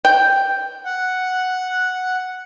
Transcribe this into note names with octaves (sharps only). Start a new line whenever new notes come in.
G5
F#5